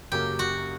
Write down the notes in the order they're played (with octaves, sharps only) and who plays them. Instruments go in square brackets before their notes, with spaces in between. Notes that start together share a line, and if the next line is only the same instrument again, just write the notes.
[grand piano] F#2 C#3 F#3 A#3 [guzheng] G4
[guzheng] F#4